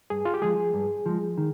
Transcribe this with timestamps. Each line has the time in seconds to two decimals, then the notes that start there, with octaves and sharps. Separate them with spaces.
0.10 G2 G#4
0.25 F4
0.34 G4
0.42 F3 G#3 G#4
0.74 G2
1.06 F3 G#3
1.38 D#3